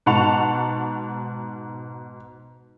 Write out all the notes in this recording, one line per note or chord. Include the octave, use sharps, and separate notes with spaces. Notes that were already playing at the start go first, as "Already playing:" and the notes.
G#2 B2 F#5 A5 C#6 F7